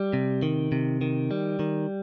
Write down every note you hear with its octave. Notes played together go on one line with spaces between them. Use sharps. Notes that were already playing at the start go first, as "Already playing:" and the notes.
Already playing: G3
C3
D#3
C3
D#3
G3
D#3